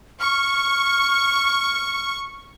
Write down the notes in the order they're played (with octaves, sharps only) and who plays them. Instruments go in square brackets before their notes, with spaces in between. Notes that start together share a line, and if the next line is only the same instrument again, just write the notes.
[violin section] C#6 [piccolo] F6